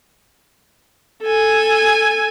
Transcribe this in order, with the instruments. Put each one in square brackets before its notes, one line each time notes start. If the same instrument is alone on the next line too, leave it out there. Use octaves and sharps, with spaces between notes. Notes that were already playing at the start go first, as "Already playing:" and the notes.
[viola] A4 G#5